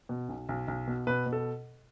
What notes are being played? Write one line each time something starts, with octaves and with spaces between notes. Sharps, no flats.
B2
B1
B1
B1
B2
B2 B4
B2
A4